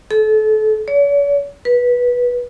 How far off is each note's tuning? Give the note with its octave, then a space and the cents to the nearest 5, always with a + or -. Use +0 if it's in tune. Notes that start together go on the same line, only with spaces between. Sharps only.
A4 -30
C#5 +45
B4 -15